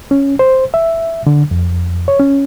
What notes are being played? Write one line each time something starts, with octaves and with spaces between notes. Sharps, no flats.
C#4
C5
E5
D3
F2
C#5
C#4